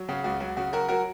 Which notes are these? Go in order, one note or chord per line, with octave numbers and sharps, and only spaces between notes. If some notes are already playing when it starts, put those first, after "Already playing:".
Already playing: F#3
C#3 F#4
C#2 F#4
F#3 F#4
C#3 F#4
F#3 F#4 A#4
F#3 F#4 A#4